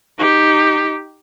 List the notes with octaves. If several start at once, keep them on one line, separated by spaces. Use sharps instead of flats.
D#4 G4